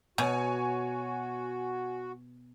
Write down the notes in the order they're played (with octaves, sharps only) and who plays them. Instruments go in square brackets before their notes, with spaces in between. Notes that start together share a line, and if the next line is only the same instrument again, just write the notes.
[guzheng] B2 [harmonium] F#4 [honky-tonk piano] C#5 G#5